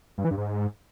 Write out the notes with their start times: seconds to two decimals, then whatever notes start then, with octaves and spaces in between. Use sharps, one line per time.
0.18 G2
0.24 E3
0.31 G2
0.38 G#2